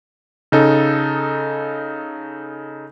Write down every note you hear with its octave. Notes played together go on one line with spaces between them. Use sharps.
C#3 D#4 A4